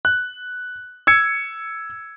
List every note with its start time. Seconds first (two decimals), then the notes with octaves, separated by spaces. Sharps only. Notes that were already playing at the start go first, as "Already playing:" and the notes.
0.05 F#6
1.07 E6 G#6 C#7